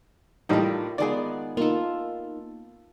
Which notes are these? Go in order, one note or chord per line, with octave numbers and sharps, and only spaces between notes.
A2 G3 A#3 D#4 F4
D#3 G#3 B3 G#4 D5
A#3 D#4 F4 A4